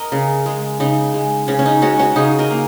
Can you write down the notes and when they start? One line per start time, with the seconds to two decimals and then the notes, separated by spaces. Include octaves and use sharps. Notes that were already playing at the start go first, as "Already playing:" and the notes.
Already playing: A#4 D#5
0.12 C#3
0.46 G#3
0.80 C#3 D#4
1.14 G#3
1.48 C#3 C#4
1.59 C#4
1.65 D#4
1.82 G#3 C#4 F#4
1.99 C#4 F#4
2.16 C#3 D#4 G#4
2.39 A#4 D#5
2.51 A#3